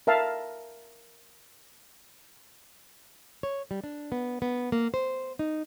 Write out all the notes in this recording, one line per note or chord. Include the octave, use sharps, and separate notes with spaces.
A#4 E5 F5 A5
C#5
G3
D4
B3
B3
A#3
C5
D#4